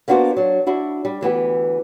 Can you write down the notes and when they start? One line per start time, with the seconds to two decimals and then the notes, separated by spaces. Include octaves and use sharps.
0.08 A#3 B3 D4 F#4 G#4 C5
0.37 F#3 D4
0.67 D4 E4 F#4
1.05 G3
1.21 D2 E3 B3 G4